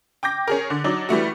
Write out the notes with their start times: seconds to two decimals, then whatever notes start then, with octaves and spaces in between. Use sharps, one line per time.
0.23 G5 D6 G6 A#6
0.47 C#4 G#4 A#4
0.70 D3
0.84 F#3 D4 D#4
1.09 E3 G3 A3 F#4